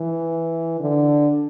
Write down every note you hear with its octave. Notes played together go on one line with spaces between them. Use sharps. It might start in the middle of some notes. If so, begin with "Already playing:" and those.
Already playing: E3
D3